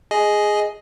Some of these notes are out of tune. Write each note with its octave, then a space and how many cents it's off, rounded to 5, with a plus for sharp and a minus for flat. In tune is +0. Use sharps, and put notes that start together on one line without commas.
G#4 +0 D#5 +0 G#5 +15